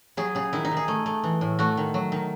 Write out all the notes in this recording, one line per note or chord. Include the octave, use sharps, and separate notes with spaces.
F#3 G#4
C#3 G#4
D#3 E4
D#4
D#3
G#4
A3
A3
E3
A2
A3 F#4
D#3
F#3
D#3